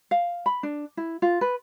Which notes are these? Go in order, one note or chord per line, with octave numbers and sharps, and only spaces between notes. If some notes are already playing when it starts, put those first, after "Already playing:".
F5
B5
D4
E4
F4
B4